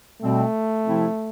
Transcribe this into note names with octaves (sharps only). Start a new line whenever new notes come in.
B2 G3 A3 C4
C3 F3 C4 E4